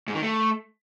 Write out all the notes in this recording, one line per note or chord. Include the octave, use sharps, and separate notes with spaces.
G#2
D#3
A3